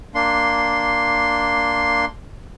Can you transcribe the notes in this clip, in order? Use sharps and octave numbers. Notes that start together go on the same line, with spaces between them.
A#3 D4 C6